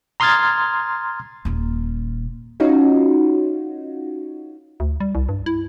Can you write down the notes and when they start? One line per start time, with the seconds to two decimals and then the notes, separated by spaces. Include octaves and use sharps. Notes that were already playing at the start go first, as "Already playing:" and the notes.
0.20 A#5 C6 D#6 F6 G#6 A6
1.45 D#1 A#2
2.60 C#4 D#4 F4 F#4
4.80 D2
5.00 G3
5.15 C2
5.29 G2
5.46 E4